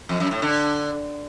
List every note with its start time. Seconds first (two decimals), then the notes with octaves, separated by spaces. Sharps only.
0.09 F2
0.20 F#2
0.31 A2
0.42 D3